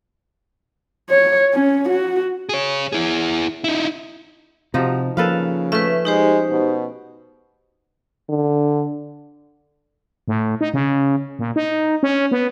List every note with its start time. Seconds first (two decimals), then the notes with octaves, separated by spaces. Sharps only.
1.10 C#5
1.54 C#4
1.89 F#4
2.49 G#4 C#5
2.92 E4 G#4
3.64 D#4 E4
4.74 C3 F3 D#4 F#4
5.17 C#3 F3 A#3 A4 B4 F5
5.72 A3 C#4 B4 E5
6.05 G#3 D#4 G4 C5
6.50 B2
8.29 D3
10.28 A2
10.61 D#4
10.74 C#3
11.39 A#2
11.56 D#4
12.03 C#4
12.31 B3